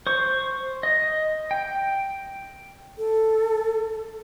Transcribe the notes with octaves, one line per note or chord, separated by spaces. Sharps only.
C5 C#6
D#5
G5
A4